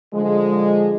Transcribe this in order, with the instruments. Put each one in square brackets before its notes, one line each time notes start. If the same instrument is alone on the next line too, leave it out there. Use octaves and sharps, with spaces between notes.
[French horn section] D3 F3 G#3